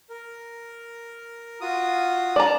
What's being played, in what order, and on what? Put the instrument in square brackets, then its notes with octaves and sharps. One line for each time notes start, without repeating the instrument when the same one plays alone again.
[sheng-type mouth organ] A#4
F4 F#4 D#6
[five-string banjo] D5 A#5 [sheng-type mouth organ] A5